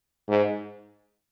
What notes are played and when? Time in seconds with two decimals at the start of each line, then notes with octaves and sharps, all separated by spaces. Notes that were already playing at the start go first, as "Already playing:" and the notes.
0.28 G#2